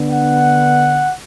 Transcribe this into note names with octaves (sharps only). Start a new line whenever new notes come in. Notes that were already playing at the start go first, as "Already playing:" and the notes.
Already playing: D3 B3 D4
F#5